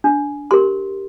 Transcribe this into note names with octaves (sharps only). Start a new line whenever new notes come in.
D4
G4 A#4 C6